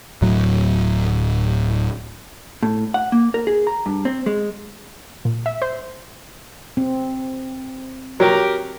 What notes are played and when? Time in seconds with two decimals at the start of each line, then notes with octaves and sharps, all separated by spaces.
0.22 D1 A2 F#3
2.63 A2
2.94 F#5
3.12 A#3
3.34 A#4
3.47 G#4
3.67 A#5
3.86 G2
4.05 C4
4.26 G#3
5.25 A#2
5.46 E5
5.62 C5
6.77 C4
8.20 F#3 G4 A#4